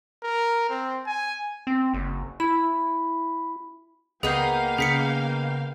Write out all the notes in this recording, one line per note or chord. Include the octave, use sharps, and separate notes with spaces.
A#4
C4
G#5
C4
F#1
E4 B5
C#2 A#3 B3 D#4 G#4 F5 G5 G6
C#3 G#4 B6 C#7